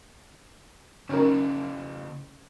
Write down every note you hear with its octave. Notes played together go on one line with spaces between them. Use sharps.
C#3 C#4 D#4 E4 A#4